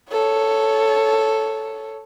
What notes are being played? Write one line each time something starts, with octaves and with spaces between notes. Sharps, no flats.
A4 C#5